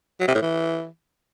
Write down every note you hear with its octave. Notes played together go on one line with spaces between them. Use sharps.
F#3
C3
A2
E3